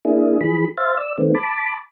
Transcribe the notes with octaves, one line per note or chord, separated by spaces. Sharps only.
A#3 D4 E4 G#4
E3 F3 G#4 B5
C5 E5 F5 A6
D5 E6
D#3 A3 B3 C4
A5 B5 D6